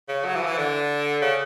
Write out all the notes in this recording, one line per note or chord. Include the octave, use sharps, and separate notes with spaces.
C#3
F#3
E3
F3
E3
D3
C#3